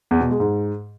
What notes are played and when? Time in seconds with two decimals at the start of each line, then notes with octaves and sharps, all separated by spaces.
0.11 E2
0.21 B2
0.30 G#3
0.40 G#2